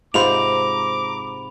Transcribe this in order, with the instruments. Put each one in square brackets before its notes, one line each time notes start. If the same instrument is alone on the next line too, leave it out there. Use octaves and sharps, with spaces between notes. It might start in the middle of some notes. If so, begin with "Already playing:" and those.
[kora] G#2 C3 [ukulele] F4 C5 [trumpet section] A#5 D6 [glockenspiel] B5 F7